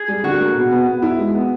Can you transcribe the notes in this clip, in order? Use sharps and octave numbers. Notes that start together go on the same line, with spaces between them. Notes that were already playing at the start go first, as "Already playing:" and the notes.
Already playing: G#4
G3
D3 F#4
A#3
B2
B3
B3
E4
G#3
B3